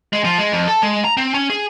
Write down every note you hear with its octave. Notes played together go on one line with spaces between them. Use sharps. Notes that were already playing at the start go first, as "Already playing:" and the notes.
G#3
F3
G#3
F2
A4
G#3
A#5
C4
C#4
G#4